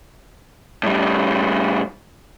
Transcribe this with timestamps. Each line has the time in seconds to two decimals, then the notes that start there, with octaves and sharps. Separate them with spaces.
0.83 A2 G3